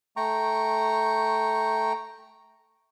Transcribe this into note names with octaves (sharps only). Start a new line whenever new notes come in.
A3 G5 A#5 C#6